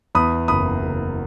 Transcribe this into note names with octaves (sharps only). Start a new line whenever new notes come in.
E2 B5 D#6
F#1 B5 D#6
F#1